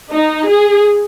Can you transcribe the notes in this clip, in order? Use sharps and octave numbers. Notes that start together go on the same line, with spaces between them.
D#4
G#4